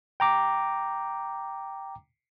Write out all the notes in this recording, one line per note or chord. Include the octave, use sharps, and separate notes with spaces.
G5 A#5 D6